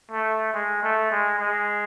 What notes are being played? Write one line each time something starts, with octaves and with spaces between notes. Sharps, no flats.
A3
G#3
A3
G#3
G#3